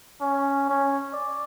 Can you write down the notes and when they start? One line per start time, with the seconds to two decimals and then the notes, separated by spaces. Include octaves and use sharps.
0.21 C#4
0.69 C#4
1.13 D5